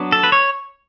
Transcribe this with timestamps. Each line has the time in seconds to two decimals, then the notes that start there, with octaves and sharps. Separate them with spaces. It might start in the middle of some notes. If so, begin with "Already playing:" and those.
Already playing: F#3 B3 D4
0.12 A4
0.23 B4
0.32 C#5